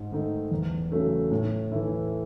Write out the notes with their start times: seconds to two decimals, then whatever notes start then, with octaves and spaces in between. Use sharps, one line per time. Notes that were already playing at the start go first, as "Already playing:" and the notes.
Already playing: G#2
0.11 D#3 A3 D#4
0.51 E2
0.92 C#3 F#3 A3
1.31 A2
1.72 E3 A3 E4